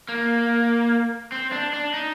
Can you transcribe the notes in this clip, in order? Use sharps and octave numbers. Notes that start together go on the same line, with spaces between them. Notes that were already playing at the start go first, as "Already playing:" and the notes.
A#3
C4
D4
D4
D#4